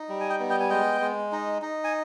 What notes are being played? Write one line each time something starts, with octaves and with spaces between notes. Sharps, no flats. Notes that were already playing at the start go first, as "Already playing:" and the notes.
Already playing: D#4
G3
G#5
D#5 G5
B3
D#5 G5
G#5
G#3 D#5 G5
G#3
D#4
D#4
G#5